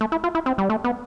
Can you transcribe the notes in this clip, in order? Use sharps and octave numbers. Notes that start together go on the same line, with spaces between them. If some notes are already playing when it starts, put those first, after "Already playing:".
A3
E4
F4
E4
C4
G3
A3
B3